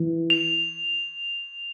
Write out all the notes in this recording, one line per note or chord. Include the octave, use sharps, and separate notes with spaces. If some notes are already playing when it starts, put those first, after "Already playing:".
Already playing: E3
F7